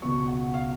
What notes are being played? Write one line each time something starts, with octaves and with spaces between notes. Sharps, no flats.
C#2 B2 F#3 B3 C#6
F#5
F5